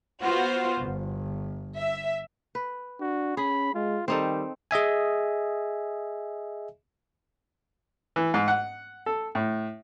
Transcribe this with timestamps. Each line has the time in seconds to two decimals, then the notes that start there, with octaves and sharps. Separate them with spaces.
0.22 B3 F4 F#4 C5
0.80 G1
1.76 E5
2.55 B4
3.00 D4 F#4
3.37 C#4 G#4 B5
3.74 G#3 F4
4.08 D#3 G3 C4 D#4 A4
4.71 G#4 D#5 E5 G#5
8.16 E3
8.34 G#2
8.48 F#5
9.06 A4
9.35 A2